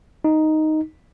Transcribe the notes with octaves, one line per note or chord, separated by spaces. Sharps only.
D#4